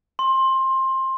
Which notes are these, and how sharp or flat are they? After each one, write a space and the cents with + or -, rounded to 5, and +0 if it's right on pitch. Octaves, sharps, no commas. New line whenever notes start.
C6 +20